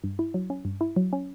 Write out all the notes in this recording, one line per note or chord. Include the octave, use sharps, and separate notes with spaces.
G2
E4
F#3
C#4
G2
E4
F#3
C#4